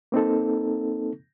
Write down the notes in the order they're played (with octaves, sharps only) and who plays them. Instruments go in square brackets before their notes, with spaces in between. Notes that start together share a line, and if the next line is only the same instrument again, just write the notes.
[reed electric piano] A#3 C4 D#4 A4